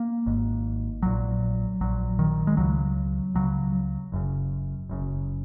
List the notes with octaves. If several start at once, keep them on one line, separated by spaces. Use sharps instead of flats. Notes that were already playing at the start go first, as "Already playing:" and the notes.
Already playing: A#3
G#1 G#2
A#1 A#2 F#3
A#1 A#2 F#3
D#3
G#3
C#2 C#3 F#3
C#2 C#3 F#3
F#1 F#2 C#3
F#1 F#2 C#3